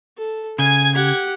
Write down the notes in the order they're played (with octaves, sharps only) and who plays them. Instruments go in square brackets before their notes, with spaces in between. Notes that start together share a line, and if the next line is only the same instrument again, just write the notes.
[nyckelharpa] A4
[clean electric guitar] C#3 [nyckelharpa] G#5 [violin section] G#6
[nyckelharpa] G4 F#5